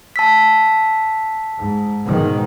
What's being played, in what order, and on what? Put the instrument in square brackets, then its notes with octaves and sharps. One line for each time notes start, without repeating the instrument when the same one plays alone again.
[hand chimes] A5 E6 B6
[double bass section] G#2
G#2 B2 D#3